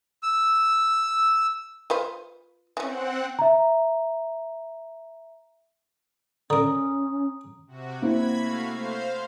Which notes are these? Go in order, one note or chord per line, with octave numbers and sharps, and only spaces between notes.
E6
F4 B4 C5
E3 C4 C#4 F#5
E5 A#5
D3 C#4 A#4 A#5 D#6
C3 F#4
A#3 C4 E4 B5 G#6
A3 F#4 F5
C5 F5